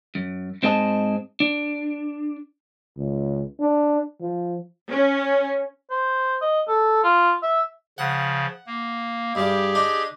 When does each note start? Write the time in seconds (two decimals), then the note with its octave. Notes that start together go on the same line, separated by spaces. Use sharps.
0.15 F#2
0.63 G#2 C4 G#4 D#5 A5
1.40 D4
2.97 C#2
3.60 D4
4.21 F3
4.90 C#4
5.90 C5
6.41 D#5
6.68 A4
7.04 F4
7.43 E5
7.98 C#3 F3 F#5
8.67 A#3
9.35 G2 G3 G4 G#4
9.75 D4 D#4